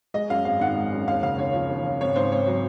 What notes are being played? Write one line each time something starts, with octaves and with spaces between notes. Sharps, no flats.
G#3 D#5
F#2 F5
G#1 F5
D#3 F#5
G#3
F#2
D#2 F5
C#3 F5
D#2 C#5
F3
D#2
C#3
G#1 C#5
G#2 C5
G#1 C#5
F#3